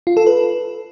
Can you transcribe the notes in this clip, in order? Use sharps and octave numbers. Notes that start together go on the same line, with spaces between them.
F4
A4
B4